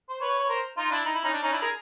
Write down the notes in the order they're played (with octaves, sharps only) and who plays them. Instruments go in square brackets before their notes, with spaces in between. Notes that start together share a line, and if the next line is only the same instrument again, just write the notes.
[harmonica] C5
B4 C#5
C#5
A#4 C5
D#4 F4
D4 E4
D#4
E4
C#4 D#4
D4
C#4 D#4
D4 E4
G#4 A#4